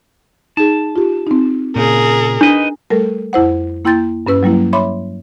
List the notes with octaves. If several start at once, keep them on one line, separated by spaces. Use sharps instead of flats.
D#4 G#4 A5
F4 G4
C4 D#4
A#2 C#3 G#4 A#4
D4 D#4 B4 D#5
G3 A3 A4 A#4
F2 E4 C5 F#5
A#3 E4 G5 C6 G6 A6
G2 C#4 B4 E6
F#3 G3 A#3 E4
C#5 E5 B5 C6 D6